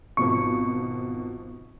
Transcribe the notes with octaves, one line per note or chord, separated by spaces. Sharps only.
G#1 B2 F3 C#6